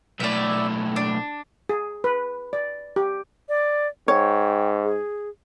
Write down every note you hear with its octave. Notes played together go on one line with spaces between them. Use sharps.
B1 A2 D5 E5
D4
G#4
B4
D5
G4
D5
G#2 C#5 G5
G#4